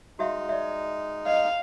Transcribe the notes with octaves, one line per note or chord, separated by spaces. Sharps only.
G#3 D#4 F#4 E5 F5
D5 E5
D#5 F5